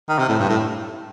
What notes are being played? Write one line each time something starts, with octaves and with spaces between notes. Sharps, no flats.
D#3
C3
A2
G2
A2